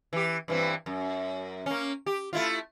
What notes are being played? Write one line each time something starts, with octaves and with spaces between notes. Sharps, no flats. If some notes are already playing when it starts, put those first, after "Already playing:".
E3 G4
G2 E3 C4
F#2
A#3 C#4
G4
A3 E4 F4